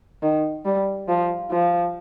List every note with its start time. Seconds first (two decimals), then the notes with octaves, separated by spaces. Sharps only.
0.23 D#3
0.65 G3
1.08 F3
1.51 F3